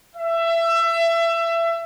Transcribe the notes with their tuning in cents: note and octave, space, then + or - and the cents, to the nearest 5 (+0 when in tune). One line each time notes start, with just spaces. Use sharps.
E5 +25